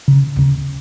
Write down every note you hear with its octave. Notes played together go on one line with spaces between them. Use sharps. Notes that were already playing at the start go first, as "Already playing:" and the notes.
C#3
C#3